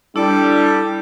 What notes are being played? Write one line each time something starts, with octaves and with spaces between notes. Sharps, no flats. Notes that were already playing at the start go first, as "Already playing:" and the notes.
G3 D4 E4 A4 D6